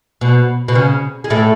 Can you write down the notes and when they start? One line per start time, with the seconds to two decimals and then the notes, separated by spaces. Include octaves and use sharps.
0.21 B2
0.68 B2
0.75 C#3
1.24 G#3
1.30 A2 A3